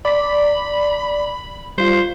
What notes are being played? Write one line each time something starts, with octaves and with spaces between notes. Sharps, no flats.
D5 B5 B6
G3 F4 C5